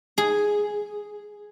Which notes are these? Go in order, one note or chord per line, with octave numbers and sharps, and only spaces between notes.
G#4